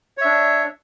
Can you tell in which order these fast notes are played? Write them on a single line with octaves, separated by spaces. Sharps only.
C#5 E5 D4